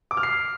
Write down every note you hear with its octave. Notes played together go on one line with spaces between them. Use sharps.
D6
F6
C7